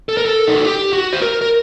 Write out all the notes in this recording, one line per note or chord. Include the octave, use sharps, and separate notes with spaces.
A4
A#4
A4
D#4
F#4
G4
F#4
C5
A#4
A#4